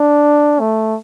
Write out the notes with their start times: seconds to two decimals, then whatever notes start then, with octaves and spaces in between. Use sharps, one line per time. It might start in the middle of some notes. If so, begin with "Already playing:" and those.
Already playing: D4
0.60 A3